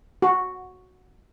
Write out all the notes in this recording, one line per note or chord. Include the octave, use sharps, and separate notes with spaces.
F#4